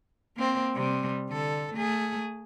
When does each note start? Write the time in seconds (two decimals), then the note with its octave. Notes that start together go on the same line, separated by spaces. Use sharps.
0.37 A#3 C4
0.75 C3 G3
1.29 D3 A4
1.74 A3 G#4